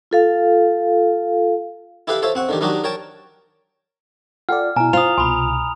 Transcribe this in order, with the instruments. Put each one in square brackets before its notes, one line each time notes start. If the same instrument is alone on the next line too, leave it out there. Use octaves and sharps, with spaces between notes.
[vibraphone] F4 A4 F5
[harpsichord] E4 G4 A4 B4 F5
F4 A4 C5 C#5 E5
C4 F#5 C#6
D3 D#3 G4
D#3 F#3 D4 D#4 F#4 G4
A#4 C#5 G5 A5
[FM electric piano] F4 A4 D5 [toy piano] F#5 G5 [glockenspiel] F6
[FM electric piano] B2 E4 [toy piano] G#5 [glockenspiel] A#5
[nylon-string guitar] F4 [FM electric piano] C5 [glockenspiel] D#6 F7
[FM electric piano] C2 B2 [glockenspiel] G#5 B5 [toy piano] C6